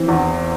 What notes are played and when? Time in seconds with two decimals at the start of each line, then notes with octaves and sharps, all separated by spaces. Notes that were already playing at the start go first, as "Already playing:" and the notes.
Already playing: E3 C4
0.08 E2